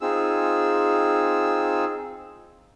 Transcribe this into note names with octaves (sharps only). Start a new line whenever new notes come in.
C4 D#4 F4 G#4 E6